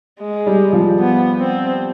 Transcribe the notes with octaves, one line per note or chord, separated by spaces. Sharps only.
G#3
G3
F3
B3
C4